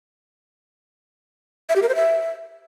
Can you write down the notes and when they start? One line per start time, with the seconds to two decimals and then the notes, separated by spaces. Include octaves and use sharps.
1.69 E5
1.76 G4
1.82 A#4
1.89 C5
1.95 E5